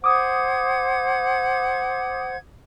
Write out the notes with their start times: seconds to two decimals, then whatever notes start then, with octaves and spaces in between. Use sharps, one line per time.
0.04 C5 F#5 D6 D#6 G#6